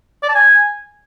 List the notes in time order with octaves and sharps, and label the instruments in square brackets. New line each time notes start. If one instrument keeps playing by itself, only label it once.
[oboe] D5
A5
G#5